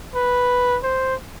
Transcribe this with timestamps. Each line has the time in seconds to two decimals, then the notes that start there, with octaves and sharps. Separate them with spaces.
0.15 B4
0.84 C5